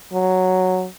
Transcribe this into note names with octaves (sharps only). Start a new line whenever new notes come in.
F#3